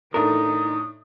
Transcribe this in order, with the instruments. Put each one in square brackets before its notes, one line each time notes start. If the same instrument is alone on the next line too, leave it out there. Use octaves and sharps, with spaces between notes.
[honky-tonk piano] A2 D4 [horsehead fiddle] D#4 [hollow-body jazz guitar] A#4 [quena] D#6